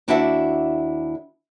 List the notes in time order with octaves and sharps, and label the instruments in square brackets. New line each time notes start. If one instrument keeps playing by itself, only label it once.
[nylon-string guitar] D#2 D4 E4 F#4 E5 F#5